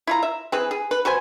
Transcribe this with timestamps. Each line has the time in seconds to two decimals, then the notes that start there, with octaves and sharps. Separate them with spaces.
0.07 E4 F4 A#5
0.23 E5
0.52 E3 C4 G#4 B4
0.71 G#4
0.91 B4
1.05 F#4 B4 C5 G#5